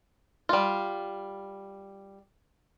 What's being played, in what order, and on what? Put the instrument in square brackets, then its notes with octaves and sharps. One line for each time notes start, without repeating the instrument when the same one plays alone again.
[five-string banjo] G3 F4